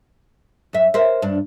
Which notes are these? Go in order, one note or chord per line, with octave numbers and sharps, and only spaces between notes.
F#2 E5
A#4 C5 E5
G2 D4